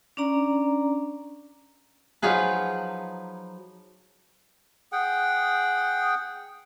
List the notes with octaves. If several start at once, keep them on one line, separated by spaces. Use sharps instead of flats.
C#4 D4 D5 A#5
F3 F#3 D#4 F4 G#4 B4
G#4 F#5 G5